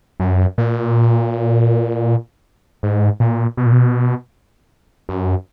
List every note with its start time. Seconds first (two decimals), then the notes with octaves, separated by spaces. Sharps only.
0.20 F#2
0.58 A#2
2.83 G#2
3.20 A#2
3.57 B2
3.66 A#2
3.72 B2
5.09 F#2